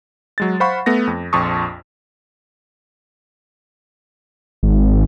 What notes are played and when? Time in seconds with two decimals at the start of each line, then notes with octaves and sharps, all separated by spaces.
0.38 F#3 G#3 A6
0.60 C5 F5 F#5 B5 C#6
0.86 A3 B3 A#6
1.07 F2
1.33 A#1 F2 A5 C6 C#6 D#6
4.63 G#1